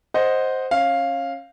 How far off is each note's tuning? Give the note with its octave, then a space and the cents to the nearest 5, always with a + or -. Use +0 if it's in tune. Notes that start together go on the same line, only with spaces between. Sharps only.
C5 +0 D#5 +0 F#5 +0
C#4 -25 F5 +0